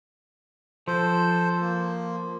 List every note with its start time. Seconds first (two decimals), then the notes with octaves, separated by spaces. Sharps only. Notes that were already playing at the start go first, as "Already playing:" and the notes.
0.88 F3 A4 C5
1.61 A#3